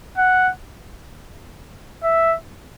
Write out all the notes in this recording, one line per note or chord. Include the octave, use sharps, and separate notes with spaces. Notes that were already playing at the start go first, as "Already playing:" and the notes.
F#5
E5